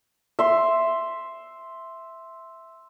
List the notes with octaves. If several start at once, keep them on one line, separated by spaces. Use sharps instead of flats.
E5 C6